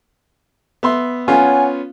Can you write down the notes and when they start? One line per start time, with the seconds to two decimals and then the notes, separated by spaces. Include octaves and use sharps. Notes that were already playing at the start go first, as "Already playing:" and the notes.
0.83 B3 E5 C6
1.28 B3 C#4 F4 C#5 F#5 G#5